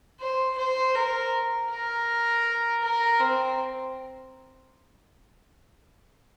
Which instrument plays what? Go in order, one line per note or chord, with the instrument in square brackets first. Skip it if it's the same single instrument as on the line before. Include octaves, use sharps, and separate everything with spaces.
[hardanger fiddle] C5
C5
A#4
A#4
A#4
C4